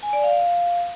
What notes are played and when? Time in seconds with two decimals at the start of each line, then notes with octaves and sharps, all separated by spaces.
0.03 G#5
0.13 D5
0.24 F5